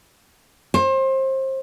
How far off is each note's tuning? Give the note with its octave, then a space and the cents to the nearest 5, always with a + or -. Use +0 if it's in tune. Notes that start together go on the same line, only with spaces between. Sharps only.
C5 +30